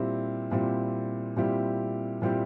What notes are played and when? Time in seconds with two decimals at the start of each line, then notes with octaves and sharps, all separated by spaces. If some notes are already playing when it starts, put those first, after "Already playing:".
Already playing: A#2 G3 C4 E4 G4
0.51 A#2 G3 C4 E4 G4
1.37 A#2 G3 C4 E4 G4
2.22 A#2 G3 C4 E4 G4